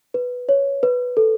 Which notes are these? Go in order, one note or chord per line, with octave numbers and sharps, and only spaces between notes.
B4
C#5
B4
A4